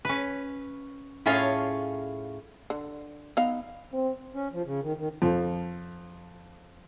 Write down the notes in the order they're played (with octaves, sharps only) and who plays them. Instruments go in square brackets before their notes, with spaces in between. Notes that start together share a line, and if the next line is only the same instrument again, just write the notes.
[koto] C#4 B4
A2 C#4 F4 G#4 C#5 F5
[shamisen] D3
B3 D#4 F5
[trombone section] C4
[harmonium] C#4
F3
C#3
D#3
D#3
[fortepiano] F2 F3